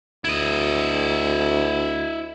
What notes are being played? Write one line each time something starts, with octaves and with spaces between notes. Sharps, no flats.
D2 E4 D#5